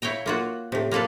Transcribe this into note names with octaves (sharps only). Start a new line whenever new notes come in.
E4 C#5 F5 G5 A#5
A#3 F4 F#4
A2 C3
A#3 F4 A4 B4 F5